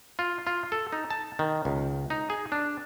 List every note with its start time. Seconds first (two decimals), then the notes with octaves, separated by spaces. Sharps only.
0.19 F4
0.47 F4
0.72 A4
0.92 D#4
1.10 A5
1.39 D#3
1.65 C#2
2.10 D#4
2.30 G#4
2.52 D4